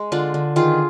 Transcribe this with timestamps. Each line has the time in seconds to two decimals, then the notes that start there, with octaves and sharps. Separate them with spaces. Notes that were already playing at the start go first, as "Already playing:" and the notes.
Already playing: G#3
0.12 D3 D4 F4
0.34 D3
0.56 D#3 F4 G#4